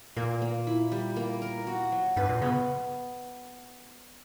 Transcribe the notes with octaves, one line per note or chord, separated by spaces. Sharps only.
A#2 A#3
A#3
E4
G3
A#3
A#4
F#4
F#3
G2 B4
A#2
C#3 B3